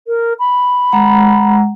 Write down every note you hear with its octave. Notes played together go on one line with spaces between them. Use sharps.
A#4
B5
G#3 F#5 A#5